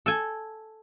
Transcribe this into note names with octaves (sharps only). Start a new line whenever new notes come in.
A4 G#5